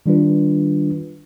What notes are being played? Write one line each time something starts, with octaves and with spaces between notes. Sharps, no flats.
D#3 G3 D4 F4 B4